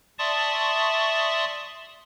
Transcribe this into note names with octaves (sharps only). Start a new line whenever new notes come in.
D5 E5 A5 C6 C#6 D#6